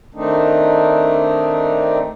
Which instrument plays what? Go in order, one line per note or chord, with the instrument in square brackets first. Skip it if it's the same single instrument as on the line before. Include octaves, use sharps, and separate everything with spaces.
[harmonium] D#3 A3 C4 D4 D#4